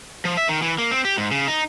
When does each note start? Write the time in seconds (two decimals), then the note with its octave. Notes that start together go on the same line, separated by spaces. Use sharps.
0.25 F3
0.37 E5
0.49 D#3
0.62 E3
0.79 A#3
0.91 C4
1.05 G4
1.17 G#2
1.31 C#3
1.48 D#4